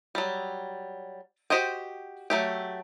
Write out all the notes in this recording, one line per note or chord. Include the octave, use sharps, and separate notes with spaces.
F#3 G3
F#4 G4 C5 D#5 G5
F#3 A3 G4